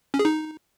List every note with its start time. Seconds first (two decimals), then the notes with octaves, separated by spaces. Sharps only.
0.14 C#4
0.19 G#4
0.25 D#4